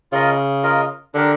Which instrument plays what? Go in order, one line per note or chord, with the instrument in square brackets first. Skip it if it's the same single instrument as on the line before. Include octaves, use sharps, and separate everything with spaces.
[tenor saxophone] C#3 [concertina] F4 A#4 D#5
[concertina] F4 A#4 D#5
[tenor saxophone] D3 [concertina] D4 G4 A#4